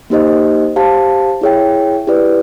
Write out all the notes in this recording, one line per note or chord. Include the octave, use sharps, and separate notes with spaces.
A#3 D#4 G4 C5 D#5
G4 C5 F5 A5
E4 G#4 C#5 E5 G5
E4 G4 B4 D5